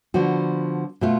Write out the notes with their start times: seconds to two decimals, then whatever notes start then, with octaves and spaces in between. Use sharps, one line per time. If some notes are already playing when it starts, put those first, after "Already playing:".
0.14 D3 F3 B3 F#4
1.01 B2 A3 F4